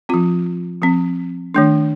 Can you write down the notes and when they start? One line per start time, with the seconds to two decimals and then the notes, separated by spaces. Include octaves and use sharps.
0.09 F3 C4 F4
0.82 F3 C4
1.55 D#3 A3 D4